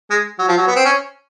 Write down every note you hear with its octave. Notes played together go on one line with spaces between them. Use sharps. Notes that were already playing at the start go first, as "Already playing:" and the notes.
G#3
F#3
F3
F#3
B3
C4
C#4